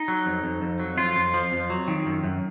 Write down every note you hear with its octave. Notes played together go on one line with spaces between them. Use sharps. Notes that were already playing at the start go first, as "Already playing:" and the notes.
Already playing: D#4
F#3
F2
F2
F2
F#3
F2 F4
F2
F3
F2
F#3
D#3
F#2
F#2